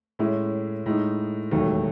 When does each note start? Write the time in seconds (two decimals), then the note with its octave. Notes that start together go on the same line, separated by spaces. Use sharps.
0.19 A2 G#3 C#4 E4
0.86 A2 G#3 D#4
1.51 E1 D#2 D#3 F#3 A3